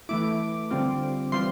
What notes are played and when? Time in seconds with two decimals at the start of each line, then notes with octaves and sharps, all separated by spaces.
0.09 E3 A3 E4 D6
0.71 D3 G3 C4 F4
1.32 E3 G3 C4 F4 C6